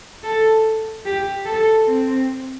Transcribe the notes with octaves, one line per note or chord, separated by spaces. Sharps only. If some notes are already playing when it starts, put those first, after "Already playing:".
A4
G4
A4
C4